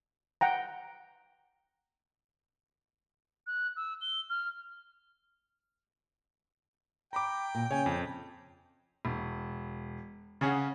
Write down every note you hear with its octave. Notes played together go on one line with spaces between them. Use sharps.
F#5 G5 A#5
F#6
E6
G7
F6
G5 A#5 B5 D6
A#2
C#3 C#5 G#5
F2
E1
C#3 C#4 G#4 F#5